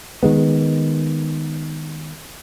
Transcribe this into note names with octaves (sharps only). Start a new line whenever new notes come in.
D#3 G#3 B3